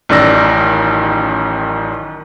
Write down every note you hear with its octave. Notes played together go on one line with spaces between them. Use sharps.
A1 F#2 D#3 D5 E6 A#6